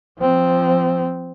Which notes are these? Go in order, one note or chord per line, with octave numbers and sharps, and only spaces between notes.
F3 C4